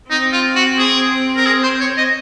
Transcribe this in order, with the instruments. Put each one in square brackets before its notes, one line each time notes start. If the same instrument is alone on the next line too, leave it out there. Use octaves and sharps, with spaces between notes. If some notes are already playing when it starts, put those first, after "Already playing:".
[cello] C4 [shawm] D#4
[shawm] F4
F#4
G#4
A#4
G#4
C5
C#5
D#5